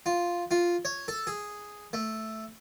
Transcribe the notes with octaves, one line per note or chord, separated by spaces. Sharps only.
F4
F4
C#5
A4
G#4
A3